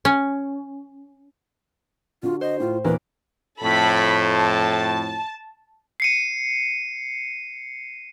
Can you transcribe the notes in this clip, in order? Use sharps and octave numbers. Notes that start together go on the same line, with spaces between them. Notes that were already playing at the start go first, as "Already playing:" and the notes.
C#4
D3 F4 F#4
C5 D#5
A2 F4
D#2 A#2 E3 A#3 B3 B4
F2 A2 A4 B5
A5
C7 C#7 D#7